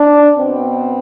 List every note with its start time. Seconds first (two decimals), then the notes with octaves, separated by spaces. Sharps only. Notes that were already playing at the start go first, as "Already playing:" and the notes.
Already playing: D4
0.37 B2 B3 C4